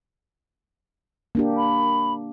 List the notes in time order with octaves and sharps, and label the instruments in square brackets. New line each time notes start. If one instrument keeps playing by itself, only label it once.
[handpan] A#3 D4 G4
[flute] B5